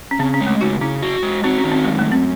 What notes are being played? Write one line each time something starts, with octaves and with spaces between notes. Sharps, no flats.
C#4
C#3 C4
C#4
G#3
A3
C#3 D#4 F#4
C#3 C#4 E4
F#4
G#3
C4 D#4 F#4
C#4
D#3
C4
F#2 G#3
A3
F#2
C4